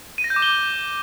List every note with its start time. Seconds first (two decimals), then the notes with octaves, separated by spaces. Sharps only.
0.18 D#7
0.24 A#6
0.30 G6
0.36 D6
0.42 G7